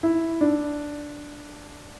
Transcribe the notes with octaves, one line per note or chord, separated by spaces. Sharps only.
E4
D4